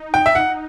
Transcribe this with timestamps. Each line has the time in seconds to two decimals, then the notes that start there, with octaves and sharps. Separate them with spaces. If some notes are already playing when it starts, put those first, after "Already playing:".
Already playing: D#4
0.14 G5
0.26 E5
0.35 F#5